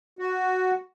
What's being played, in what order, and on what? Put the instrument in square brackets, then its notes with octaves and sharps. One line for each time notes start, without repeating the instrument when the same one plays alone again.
[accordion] F#4